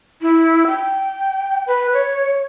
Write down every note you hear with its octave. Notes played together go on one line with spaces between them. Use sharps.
E4
G5
B4
C#5